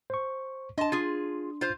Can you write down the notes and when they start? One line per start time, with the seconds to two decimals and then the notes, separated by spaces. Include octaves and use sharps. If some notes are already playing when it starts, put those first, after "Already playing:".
0.10 C5 C#6
0.78 D4 D#5 A5 C6
0.92 F4 G#4
1.61 F4 C5